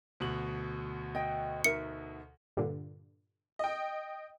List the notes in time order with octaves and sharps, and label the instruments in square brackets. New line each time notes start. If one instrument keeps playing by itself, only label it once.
[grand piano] D2 B2 F#7
[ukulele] D#5 G5
[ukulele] D#4 A#4 E5 [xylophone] C#7
[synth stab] G2 A#2 D3
[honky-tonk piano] D#5 G5